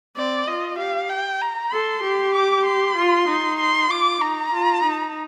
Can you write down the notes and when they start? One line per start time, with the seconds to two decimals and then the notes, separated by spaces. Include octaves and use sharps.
0.16 C4 D5
0.47 F4 D#5
0.78 G4 F5
1.09 G5
1.41 A#5
1.72 A4 C6
2.03 G4
2.34 D6
2.65 C6
2.96 F4
3.28 D#4
3.59 C6
3.90 F4 D6
4.21 D#4 A#5
4.52 F4
4.83 D#4